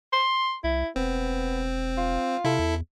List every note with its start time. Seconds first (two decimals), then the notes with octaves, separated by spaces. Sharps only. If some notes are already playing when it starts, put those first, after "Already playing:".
0.13 C6
0.64 C2 E4
0.96 E1 B3 C4
1.98 F4
2.45 C3 E4 A4
2.59 E2